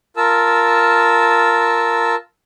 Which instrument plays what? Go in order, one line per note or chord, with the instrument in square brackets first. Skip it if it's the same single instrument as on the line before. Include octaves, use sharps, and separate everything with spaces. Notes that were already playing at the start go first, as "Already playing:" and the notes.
[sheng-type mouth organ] F4 A#4 A5 E6